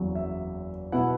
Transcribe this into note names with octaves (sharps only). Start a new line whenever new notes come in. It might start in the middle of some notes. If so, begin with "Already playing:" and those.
Already playing: F#1 E2 C#3 F#3
E5
B2 B3 E4 F#5